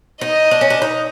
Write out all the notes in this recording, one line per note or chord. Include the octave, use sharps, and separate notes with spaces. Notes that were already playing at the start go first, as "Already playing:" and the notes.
D#4 D#5
D4
C#4
D4
D#4